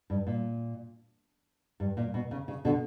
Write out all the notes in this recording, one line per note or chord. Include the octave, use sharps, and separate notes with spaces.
G2
A#2
G2
A#2
B2
C#3
C#3
B2 D3